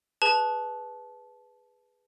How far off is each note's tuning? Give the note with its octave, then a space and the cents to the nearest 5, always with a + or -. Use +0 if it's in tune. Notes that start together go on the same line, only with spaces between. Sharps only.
G#4 -10 B4 +0 A5 -20